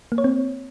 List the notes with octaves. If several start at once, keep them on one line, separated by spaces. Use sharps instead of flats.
A#3
C#5
C4